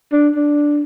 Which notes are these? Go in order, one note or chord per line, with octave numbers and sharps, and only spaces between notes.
D4
D4